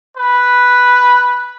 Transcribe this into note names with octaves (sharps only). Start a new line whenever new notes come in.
B4